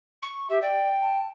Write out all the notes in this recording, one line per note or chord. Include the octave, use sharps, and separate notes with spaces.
C#6
G4 E5
D5 G5
A5